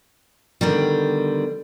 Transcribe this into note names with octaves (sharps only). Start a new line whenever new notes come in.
B2 D3 D#3 G3